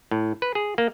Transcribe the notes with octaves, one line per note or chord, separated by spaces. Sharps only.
A2
B4
G#4
A#3